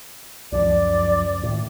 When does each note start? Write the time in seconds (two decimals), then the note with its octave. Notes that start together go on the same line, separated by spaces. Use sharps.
0.52 C#2 F#2 F3 D5
1.43 A2 D#3